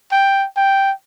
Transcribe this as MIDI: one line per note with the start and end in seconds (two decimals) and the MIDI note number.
0.12 0.46 79
0.57 0.92 79